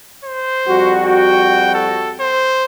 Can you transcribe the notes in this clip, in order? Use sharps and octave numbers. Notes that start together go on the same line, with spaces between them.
C5
F2 G3 F#4
G5
A4
C5